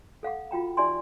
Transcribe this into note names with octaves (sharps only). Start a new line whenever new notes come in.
A4 F5 F#5 D6
F4 F#4 G5 A#5
D#4 G4 D5 E5 G#5 C6